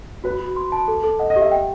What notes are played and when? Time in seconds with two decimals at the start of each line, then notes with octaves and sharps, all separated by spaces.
0.24 F#4 B4
0.40 F#4
0.56 C6
0.72 A5
0.88 A4
1.04 A4
1.19 D#5 F#5
1.30 D#5
1.36 G4
1.41 E5
1.51 G5